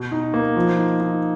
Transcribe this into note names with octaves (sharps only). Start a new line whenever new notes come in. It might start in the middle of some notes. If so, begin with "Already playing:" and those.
Already playing: B2
D#4
A#3
F3
D#4
D#4